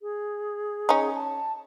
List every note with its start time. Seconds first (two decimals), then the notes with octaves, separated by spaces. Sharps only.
0.02 G#4
0.89 C#4 D#4
1.15 A5